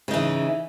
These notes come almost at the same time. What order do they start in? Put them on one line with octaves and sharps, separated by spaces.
C#3 D#4 E3